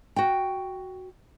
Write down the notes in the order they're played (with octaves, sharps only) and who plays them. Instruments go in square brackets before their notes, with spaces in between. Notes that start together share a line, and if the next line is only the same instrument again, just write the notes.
[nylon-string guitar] F#4 G5